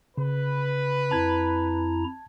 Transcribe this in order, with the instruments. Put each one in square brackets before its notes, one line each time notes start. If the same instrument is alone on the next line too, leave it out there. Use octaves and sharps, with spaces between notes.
[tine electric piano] C#3 [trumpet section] B4
[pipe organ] F2 E4 A#5 [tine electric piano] A5 G#6